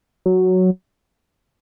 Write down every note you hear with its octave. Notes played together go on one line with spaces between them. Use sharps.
F#3